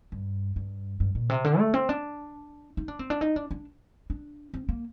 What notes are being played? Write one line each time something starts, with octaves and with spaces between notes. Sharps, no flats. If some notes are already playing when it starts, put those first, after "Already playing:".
G2
G2
G2
A#2
C3
D3
A3
C4
D4
D#4
D4
C4
D4
D#4
D4
D4
D4
C4
A#3